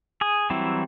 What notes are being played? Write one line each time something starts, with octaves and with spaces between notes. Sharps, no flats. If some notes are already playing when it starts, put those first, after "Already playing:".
G#4 D#6
E3 F#3 G3 C4 E4